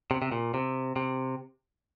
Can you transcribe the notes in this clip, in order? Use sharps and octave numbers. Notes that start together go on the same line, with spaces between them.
C3
C3
A#2
C3
C3